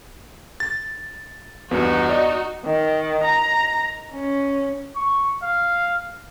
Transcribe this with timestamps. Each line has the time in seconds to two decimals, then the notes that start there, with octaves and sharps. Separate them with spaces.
0.60 A6
1.71 E2 G2 B3 D#4 F#4
2.09 D5 D#5
2.65 D#3
3.24 A#5
4.13 C#4
4.96 C#6
5.42 F5